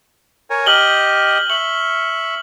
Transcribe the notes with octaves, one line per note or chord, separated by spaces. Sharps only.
A#4 C#5 G#5
G4 D#5 F6 F#7 G7
E5 C#6 F#7